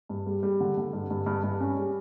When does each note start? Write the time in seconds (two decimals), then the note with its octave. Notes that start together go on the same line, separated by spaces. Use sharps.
0.09 G2
0.27 G3
0.43 G3
0.60 D3
0.77 D3
0.93 G2
1.10 G2
1.26 G2
1.43 G2
1.60 C#4
1.77 G3